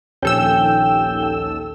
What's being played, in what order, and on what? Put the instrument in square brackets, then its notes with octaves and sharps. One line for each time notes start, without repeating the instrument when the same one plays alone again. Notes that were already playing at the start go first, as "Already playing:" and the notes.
[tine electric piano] A#1 C#4 [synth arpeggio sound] D#2 A4 E6 [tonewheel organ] G5